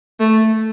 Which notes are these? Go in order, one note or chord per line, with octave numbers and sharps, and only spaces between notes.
A3